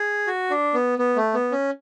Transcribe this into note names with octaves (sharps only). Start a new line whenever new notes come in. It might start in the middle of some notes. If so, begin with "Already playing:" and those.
Already playing: G#4
F#4
D4
B3
B3
A3
B3
C#4